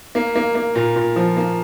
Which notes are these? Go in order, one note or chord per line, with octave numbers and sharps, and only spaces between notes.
A#3
A#3
A#3
A#2
A#2
F3
A#3